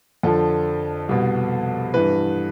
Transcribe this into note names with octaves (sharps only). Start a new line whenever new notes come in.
F2 D3 F3 A4
C2 B2
G2 E3 B4